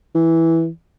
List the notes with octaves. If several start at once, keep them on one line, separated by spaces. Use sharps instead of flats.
E3